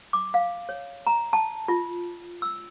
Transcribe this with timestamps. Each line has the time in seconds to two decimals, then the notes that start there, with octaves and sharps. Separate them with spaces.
0.13 D6
0.34 F5
0.69 C#5
1.07 A#5
1.33 A5
1.68 F4
2.42 E6